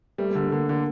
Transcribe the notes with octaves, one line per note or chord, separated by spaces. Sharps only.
G3 A3
A3
D3
A#3
D3 A#3
D3